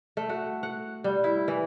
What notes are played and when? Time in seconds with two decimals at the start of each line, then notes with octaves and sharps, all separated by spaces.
0.17 A3
0.29 F#4
0.63 F#5
1.04 G3
1.24 E4
1.48 E3